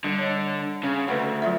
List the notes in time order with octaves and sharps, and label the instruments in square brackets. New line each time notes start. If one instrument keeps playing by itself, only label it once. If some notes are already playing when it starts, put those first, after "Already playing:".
[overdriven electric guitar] D3 [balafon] G3
[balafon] C#5 D#5
[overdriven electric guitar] C#3
[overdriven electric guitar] D2 [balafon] A4 B4 F#5
[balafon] F#3 F4 E5